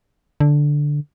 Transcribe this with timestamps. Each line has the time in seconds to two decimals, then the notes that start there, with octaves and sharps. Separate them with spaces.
0.40 D3